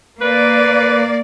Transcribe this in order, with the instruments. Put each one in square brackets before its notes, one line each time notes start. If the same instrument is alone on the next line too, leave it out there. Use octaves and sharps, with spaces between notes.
[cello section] A#3 D5 [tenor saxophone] B4